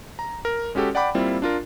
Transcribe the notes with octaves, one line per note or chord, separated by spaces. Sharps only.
A#5
A#4
G#3 C#4 F#4 G4 A4
D5 F#5 G5 B5 D6
G3 A#3 C4 E4 F4
D4 F4 A#4